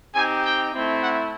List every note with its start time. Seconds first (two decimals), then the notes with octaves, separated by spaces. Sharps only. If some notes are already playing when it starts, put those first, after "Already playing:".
0.14 C4 D#4 G4 G#5
0.44 G5
0.72 A3 C4 E4
1.01 F#5